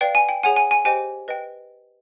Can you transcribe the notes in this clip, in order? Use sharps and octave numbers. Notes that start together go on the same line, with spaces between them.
B4 D5 F5 G5
G#5
G5
G#4 C#5 F#5 G#5
G#5
G#5
G4 C5 D#5 G5 G#5
B4 D#5 G5